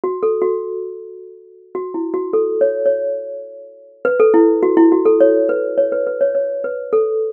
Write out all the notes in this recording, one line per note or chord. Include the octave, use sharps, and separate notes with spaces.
F#4
A4
F#4
F#4
E4
F#4
A4
C#5
C#5
B4
A4
E4
F#4
E4
F#4
A4
C#5
B4
C#5
B4
B4
C#5
C#5
B4
A4